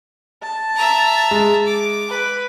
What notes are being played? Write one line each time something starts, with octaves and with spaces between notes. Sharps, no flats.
A5
E5 A#5
G#3
D6
B4